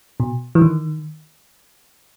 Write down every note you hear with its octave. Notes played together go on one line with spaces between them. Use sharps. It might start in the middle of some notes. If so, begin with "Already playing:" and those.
B2
E3
D#3